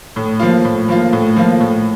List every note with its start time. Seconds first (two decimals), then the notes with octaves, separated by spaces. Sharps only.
0.16 A2
0.40 F3 A#3 F4
0.65 A2
0.89 F3 A#3 F4
1.13 A2
1.36 F3 A#3 F4
1.60 A2